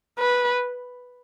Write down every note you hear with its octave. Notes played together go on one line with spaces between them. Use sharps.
B4